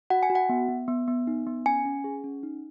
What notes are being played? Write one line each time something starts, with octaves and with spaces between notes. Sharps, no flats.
F#4 F#5
G#5
F#4
F#5
B3
B3
B3
B3
D#4
B3
C#4 G#5
C#4
G#4
C#4
D#4